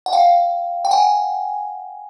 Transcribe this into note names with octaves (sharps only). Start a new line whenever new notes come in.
F#5
F5 G5
G5
F#5 G#5